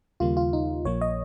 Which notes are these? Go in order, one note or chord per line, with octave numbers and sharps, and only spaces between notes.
D#2 C#3 G3 A#3 F4
F4
D#4
A#1 A#2 F3 A#3 C#5
D#5